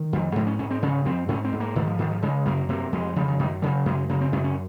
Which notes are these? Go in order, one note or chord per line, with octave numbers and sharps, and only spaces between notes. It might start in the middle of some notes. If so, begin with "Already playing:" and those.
Already playing: D#3
F2
G#2 F3
C#4
G#2 C#4
C4
C#3 C#4
F2 C4
G#2 C#4
C4
G#2
A#3
G#2 D#3
F3
G#2 D#3
F3
C#3 G#3
F#2 A#3
C3 A#3
F2 G#3
C#3 F3
D#3
F#2 D#3
C#3 F#3
F#2 G#3
C#3 A#3
C4
F#2 C#4
C#4